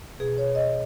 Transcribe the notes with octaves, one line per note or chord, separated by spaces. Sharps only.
B2 G#4
C#5
D#5